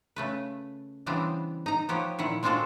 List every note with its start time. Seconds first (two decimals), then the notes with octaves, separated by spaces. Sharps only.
0.16 C#3 A3 B4
1.06 C#3 E3 G3 B3 C4 D4
1.66 D#4 A#5
1.89 F3 B3 G4 C#5
2.19 A#2 D#3 E4 F#5
2.43 G#3 C4 D4 F4 F#4 A4